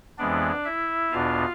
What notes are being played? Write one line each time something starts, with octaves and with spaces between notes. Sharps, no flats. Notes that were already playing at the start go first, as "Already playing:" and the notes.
F2 E3 G#3 B3 D4 D5
E4 E5
E2 B2 B3 D4 F4 F5